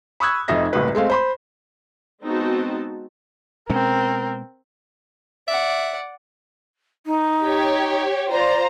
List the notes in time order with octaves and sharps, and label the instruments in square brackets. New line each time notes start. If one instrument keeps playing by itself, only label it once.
[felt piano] B5 C#6 D#6 E6 F#6 G#6
F1 F2 D#4 E5 A#6
F#1 C2 A2 B4
G#3 A3 C4 F5
C5 B5 C6
[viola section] G#3 B3 C4 D#4 F#4 A5
[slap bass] B2 G#3 C#4 [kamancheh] C4 A#4
[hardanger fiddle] D5 F#5 [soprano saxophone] E5
[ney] D#4
[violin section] G4 C#5
[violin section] F4 C5 A#5 [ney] D5